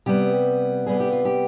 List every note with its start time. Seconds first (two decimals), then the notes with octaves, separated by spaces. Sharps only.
0.06 C3 G3 B3 G4
0.86 C3 G3 B3 G#4
1.00 G4
1.12 F4
1.25 G4